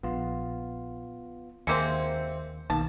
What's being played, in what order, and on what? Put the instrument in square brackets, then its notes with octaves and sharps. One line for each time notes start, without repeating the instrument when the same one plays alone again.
[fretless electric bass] A#1 [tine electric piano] B3 F4
[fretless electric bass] D#2 [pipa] G#3 A#3 C4 [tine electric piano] C5 E5 C#7
[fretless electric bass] B1 [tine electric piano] D#3 A#3 [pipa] A5